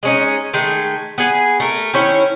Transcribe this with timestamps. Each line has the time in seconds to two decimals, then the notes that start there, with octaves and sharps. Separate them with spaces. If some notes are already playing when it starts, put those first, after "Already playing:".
0.03 G#3 C#4 D#4
0.54 D#3 G#3 A3
1.18 B3 G#4
1.60 A3 A#4
1.93 D#3 C#4 E4 C#5